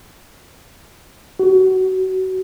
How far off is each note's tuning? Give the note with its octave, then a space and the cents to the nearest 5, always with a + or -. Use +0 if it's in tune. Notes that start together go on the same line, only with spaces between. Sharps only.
F#4 +25